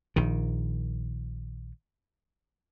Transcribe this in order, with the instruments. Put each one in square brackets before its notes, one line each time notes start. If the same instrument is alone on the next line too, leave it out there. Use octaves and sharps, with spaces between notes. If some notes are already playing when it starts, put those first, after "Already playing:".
[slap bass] A#1 D#3